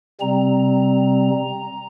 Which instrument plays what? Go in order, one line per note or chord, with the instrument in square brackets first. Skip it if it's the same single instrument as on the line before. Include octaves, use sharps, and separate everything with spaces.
[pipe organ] C3 G3 C4 A#5